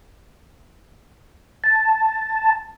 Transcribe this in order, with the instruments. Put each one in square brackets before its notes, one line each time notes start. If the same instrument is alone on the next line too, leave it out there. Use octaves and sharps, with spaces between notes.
[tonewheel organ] A5